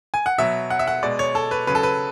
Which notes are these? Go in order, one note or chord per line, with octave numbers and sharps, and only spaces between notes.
G#5
F#5
B2 F#3 E5
F#5
E5
F#5
B2 G#3 D5
C#5
A4
B4
C#3 F#3 B4
A4
B4